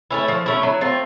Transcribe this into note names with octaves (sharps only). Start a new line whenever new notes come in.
A3 C#4 E4
F3
A3 C#4 E4
F#3
A3 C4 F4